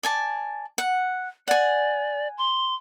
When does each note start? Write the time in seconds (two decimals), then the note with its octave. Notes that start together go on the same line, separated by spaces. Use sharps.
0.03 D5 G#5 A5
0.78 F#5
1.48 D5 F#5 G#5
2.38 C6